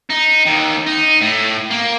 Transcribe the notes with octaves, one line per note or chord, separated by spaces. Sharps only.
D#4
D#2 D#3
D#4
A2
A#3